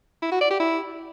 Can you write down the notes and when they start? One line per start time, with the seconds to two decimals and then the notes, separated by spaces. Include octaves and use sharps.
0.22 E4
0.32 F#4
0.41 D5
0.51 G4
0.60 E4